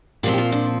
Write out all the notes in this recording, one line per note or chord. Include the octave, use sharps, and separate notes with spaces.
A#2 F3 C4 G4
G4
F4
D4